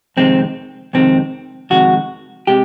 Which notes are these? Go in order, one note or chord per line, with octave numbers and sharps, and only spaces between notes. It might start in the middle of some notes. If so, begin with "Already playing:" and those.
F2 C3 D#3 G#3 C4
F2 C3 D#3 G#3 C4
F2 C3 D#3 G#3 F#4
C3 G#3 G4